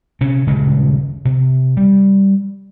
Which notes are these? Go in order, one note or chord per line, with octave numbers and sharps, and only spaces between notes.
C3 C#4
D#1 G2 C#3 G#3
C3
G3